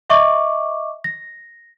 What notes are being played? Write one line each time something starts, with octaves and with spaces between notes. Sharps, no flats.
D#5 E5 C#6 D6
A#6